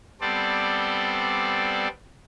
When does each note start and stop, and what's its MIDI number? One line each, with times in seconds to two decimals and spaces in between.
0.21 1.88 55
0.21 1.88 59
0.21 1.88 60
0.21 1.88 69
0.21 1.88 72
0.21 1.88 74